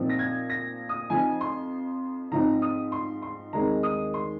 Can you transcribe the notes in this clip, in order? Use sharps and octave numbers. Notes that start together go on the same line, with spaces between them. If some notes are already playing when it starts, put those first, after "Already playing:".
Already playing: A#2 F3 C4 D#4
A#6
G#6
A#6
D#6
F2 F3 C4 D#4 G#5
C6
G#2 F3 C4 D#4 A#5
D#6
C6
C6
D#2 D#3 G#3 C4 D#4 A#5
D#6
C6